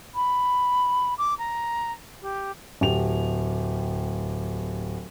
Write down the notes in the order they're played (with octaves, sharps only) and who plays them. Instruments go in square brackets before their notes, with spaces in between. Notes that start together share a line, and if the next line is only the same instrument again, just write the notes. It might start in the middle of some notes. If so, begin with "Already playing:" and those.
[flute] B5
D6
A#5
G4
[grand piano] D1 G4 F7